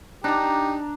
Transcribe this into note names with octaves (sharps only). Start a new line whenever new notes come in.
D4 D#4 G4 A#5